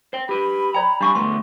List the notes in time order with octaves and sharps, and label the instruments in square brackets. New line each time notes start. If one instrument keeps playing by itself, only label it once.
[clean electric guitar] C5 G5
[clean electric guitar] G4 B4 [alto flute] B5
[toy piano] C#5 D5 G5 [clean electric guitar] A#5
[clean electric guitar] G3 F5 G#5 [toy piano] D4 C#6
[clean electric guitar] D3 A3 B3 [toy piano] C6